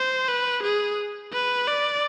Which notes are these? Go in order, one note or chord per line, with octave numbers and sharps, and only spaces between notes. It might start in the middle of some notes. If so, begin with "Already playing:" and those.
Already playing: C5
B4
G#4
B4
D5